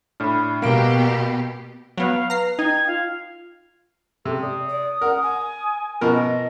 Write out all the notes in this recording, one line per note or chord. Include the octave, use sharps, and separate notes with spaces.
A2 D4 B5 F6
B2 A#3 G4 F5 A#5 D7
F#3 B3 F5
B4 A#5 C7
D#4 G5 G#6
F4 F5
C3 A4
D5 D#6
D5
A#4 F#5
G#5
B2 F3 A#4 D#5